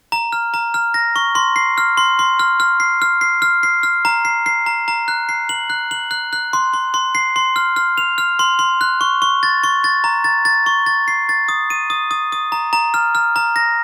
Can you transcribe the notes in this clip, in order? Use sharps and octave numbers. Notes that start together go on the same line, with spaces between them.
A#5
F6
A#5
F6
A#6
C#6
C6
C7
F6
C6
C6
F6
F6
C7
F6
C7
F6
C7
F6
A#5
C7
C7
A#5
A#5
F#6
C7
F#7
F#6
F#7
F#6
F#6
C6
C6
C6
C7
C6
F6
F6
F7
F6
C6
C6
F#6
C#6
C#6
A6
C#6
A6
A#5
A6
A6
C#6
A6
C7
A6
D#6
D#7
D#6
D#6
D#6
A#5
A#5
F6
F6
A#5
A#6